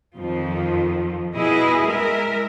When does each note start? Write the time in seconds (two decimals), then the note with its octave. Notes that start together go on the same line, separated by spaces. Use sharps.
0.16 F2 D#3 F3
1.35 B2 E4 G#4 B4 D#5
1.86 G#3 A#4 E5